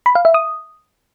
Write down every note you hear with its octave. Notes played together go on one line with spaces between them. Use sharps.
B5
F5
E5
D#6